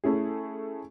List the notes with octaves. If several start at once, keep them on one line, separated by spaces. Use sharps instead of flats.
A3 C#4 E4 G#4